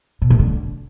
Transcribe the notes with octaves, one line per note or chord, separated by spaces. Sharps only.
B2
A2
D3